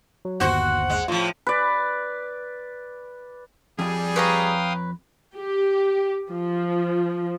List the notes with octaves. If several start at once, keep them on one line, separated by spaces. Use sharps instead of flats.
F#3
G1 D#2 F#4 C5 F#5 C#6
G#3
A2 F3 F4
B4 D5
F2 G3 G#4
B4 C#5 F5 G5 A#5 D#6
G4
F3